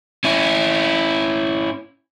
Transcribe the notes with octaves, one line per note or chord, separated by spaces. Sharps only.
C#4 E4